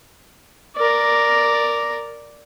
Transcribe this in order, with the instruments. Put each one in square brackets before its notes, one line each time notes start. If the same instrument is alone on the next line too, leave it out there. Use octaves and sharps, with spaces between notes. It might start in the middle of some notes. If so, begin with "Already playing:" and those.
[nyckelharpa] A#4 D5